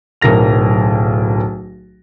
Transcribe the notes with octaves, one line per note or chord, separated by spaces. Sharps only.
D1 B1 A#4 A#6 F7